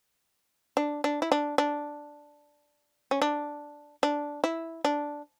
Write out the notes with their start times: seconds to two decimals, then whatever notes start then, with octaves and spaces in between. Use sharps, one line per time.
0.77 D4
1.04 D4
1.22 E4
1.32 D4
1.58 D4
3.11 C#4
3.22 D4
4.03 D4
4.44 E4
4.85 D4